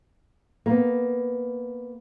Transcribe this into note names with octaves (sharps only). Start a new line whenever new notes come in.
A#3 B3